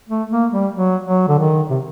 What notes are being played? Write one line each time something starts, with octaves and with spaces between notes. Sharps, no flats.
A3
A#3
G3
F#3
F#3
D3
D#3
C3